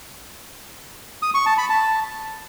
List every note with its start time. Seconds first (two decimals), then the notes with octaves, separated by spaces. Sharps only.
1.23 D#6
1.34 C#6
1.46 A5
1.58 B5
1.70 A5